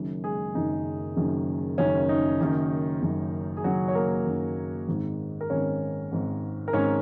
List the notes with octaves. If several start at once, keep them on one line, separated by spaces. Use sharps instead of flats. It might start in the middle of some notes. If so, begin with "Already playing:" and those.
Already playing: F#1 F#2 D#3
G#3 G#4
F#1 F#2 D#3 D#4
F#1 F#2 D#3
F#1 F#2 D#3 C#4
D#4
F#1 F#2 D#3
F#1 F#2 D#3
G#4
F#1 F#2 D#3 F#3 F#4
C#5
A#3 A#4
F#1 F#2 D#3
G#1 G#2 D#3
A#4
G#1 G#2 D#3 C#4 C#5
G#1 G#2 D#3
A#4
G#1 G#2 D#3 C#4 C#5